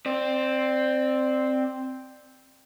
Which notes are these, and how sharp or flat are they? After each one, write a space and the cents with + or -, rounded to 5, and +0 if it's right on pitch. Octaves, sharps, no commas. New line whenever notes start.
C4 +0 D5 +20